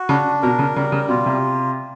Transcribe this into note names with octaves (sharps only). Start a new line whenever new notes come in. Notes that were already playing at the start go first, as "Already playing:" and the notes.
Already playing: F#4
C#3 D4
B2 A#4
C#3
C#3 G3
C#3
B2 F4
C3